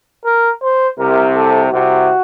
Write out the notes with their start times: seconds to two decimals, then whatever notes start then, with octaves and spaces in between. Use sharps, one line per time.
0.25 A#4
0.62 C5
0.99 C2 C3 A#4
1.35 A4
1.72 C2 C3 F#4